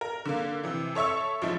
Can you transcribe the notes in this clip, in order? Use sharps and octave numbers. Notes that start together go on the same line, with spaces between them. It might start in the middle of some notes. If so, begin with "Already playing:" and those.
A#4
D3 A#3
C3 E3
A4 C#5 E5 C#6 E6
A1 F3 G#3 E4